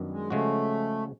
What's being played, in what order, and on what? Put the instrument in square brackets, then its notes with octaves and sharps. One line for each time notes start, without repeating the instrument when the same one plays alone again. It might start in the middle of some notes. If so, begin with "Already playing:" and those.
Already playing: [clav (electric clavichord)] F#2 D#3 G3 B3 D4
[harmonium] G#3
[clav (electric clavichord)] C#3 F3 G#3 C#4 F#4 [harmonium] A3